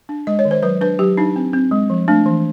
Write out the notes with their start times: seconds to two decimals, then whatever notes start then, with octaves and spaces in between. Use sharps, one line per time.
0.09 D4
0.27 G#3 D#5
0.39 C#5
0.45 D#3
0.51 C5
0.63 F#3 B4
0.81 D4 B4
0.99 F#3 G4
1.18 D4 D#4
1.36 C4
1.53 C4
1.71 G#3
1.90 F3
2.08 A3 D4
2.26 E3